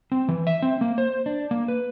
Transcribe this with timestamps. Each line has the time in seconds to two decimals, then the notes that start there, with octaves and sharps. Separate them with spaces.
0.12 C4
0.28 E3
0.47 E5
0.62 C4
0.81 A#3
0.98 C5
1.26 D4
1.51 A#3
1.68 B4